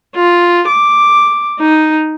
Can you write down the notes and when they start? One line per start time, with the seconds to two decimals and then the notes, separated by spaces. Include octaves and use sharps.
0.15 F4
0.68 D6
1.60 D#4